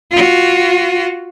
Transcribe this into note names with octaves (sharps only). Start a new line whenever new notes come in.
F4 F#4